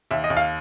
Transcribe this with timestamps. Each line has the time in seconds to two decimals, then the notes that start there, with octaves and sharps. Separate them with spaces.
0.11 D#2 E5
0.24 D#5
0.30 D#2
0.37 F5